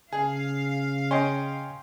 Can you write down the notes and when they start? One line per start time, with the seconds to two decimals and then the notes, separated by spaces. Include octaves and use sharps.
0.12 C#3 G#4 F5
1.11 C#4 D#5 G5 C6